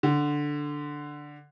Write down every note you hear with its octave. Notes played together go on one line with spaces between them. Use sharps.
D3